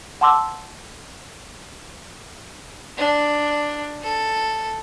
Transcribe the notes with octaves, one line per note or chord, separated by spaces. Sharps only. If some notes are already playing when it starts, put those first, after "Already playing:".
F#5 A5 C6 D6 E6
D4
A4